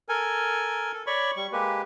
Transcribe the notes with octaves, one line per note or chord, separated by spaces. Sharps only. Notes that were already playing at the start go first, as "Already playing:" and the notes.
A4 A#4 G#5
A4
C#5 D5 B5 C#6
G3 C#6
G#3 A#3 G4 B4